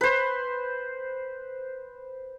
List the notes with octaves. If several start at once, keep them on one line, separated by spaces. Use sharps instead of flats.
B4 C5